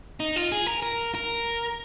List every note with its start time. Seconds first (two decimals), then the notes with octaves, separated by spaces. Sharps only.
0.20 D#4
0.36 F4
0.52 G#4
0.67 A#4
0.82 A#4
1.15 A#4